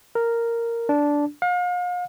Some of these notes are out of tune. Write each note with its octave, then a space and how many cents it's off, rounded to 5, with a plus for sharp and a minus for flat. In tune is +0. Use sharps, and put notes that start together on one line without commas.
A#4 -5
D4 -10
F5 +40